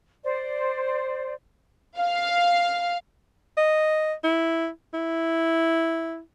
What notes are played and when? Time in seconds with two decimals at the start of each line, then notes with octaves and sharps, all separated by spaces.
0.23 C5 D5
1.99 F5
3.57 D#5
4.24 E4
4.94 E4